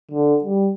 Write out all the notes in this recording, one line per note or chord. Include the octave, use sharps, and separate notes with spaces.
D3
G3